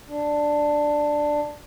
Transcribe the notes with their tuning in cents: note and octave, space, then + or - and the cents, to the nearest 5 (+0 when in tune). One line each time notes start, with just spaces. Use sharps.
D4 +5